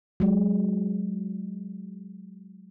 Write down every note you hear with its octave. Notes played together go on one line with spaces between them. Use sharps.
F#3 G#3